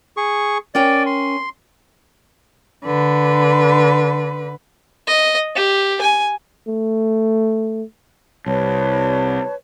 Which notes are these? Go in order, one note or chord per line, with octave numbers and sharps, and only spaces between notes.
G#4 C#6
C#4 A#4 D5 G5
C6
D3 B4
D#5
G4
G#5
A3
C2 B4 C#5 A5